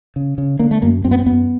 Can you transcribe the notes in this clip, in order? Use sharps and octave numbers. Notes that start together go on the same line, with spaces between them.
C#3
C#3
D3 A#3
A3
F#2 A#3
F#2 C4
B3
C4
F#2 B3